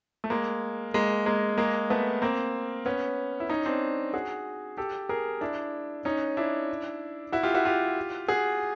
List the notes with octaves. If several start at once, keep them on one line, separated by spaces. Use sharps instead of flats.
A3
G#3 A#3
G#3 A#3
G#3 A#3
G#3 A#3
A3 B3
A#3 C4
B3 C#4
E4
C#4 D#4
C4 D4
F#4 G#4
G4 A4
G#4 A#4
D4 E4
C#4 D#4
D4 E4
E4 F#4
F4 G4
E4 F#4
F4 G4
F#4 G#4